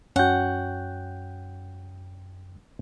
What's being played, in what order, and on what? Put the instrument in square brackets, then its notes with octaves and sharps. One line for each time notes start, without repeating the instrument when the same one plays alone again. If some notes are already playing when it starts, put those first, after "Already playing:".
[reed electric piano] F#2 G5 G6 [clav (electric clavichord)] C#4 F#4 [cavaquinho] F#5